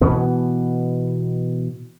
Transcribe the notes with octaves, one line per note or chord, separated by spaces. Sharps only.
B2 E3 B3